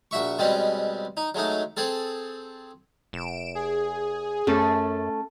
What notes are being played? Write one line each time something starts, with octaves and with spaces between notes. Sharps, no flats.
A#1 F#4 E5 C#6
B2 G3 G#3 C4 C#4
D#4
F#3 G#3 A3 D#4
C4 G#4 A4
F1 D7 E7
G#4
F#2 A3 C#4 A4